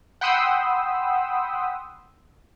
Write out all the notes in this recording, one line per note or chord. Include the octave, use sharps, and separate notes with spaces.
F#5 G5 B5 C6 D#6 E6